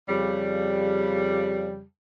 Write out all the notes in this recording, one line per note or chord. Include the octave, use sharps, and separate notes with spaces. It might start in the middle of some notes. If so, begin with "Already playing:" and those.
F2 C#3 G3